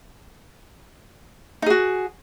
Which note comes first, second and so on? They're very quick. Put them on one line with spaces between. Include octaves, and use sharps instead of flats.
D#4 G#4 F#4